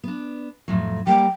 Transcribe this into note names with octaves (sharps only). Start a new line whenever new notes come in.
B3 D4
F2 A2 F#3
G3 A#3 D5 G5